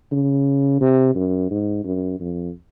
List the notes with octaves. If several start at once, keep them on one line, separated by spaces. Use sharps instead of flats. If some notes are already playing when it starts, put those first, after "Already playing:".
C#3
C3
F#2
G#2
F#2
F2